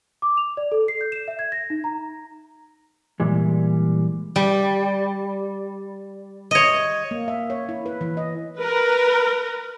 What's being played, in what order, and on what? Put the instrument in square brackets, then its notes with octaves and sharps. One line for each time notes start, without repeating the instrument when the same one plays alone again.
[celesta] D6
F7
D5
A4
C7
G6
E7
E5
G#6
A#6
D#4
A#5
[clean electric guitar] A#2 E3 G3 G#3
[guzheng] G3
C#5 D#5
[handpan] A#3
E5
C#5
E4
B4
E3
D#5
[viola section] A#4 B4